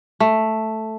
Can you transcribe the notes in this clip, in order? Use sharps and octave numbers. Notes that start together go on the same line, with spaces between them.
A3